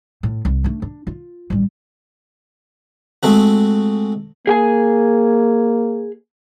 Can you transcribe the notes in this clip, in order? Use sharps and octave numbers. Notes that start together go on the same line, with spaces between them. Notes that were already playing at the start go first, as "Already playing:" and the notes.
A2
C2
A3 D4
D4
F4
A1 G3
G#3 A3 C4 F#4
A#3 G#4 G5 G#5